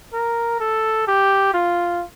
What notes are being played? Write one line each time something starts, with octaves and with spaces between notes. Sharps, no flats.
A#4
A4
G4
F4